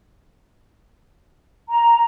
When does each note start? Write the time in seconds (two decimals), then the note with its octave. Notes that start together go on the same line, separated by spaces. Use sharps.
1.69 A#5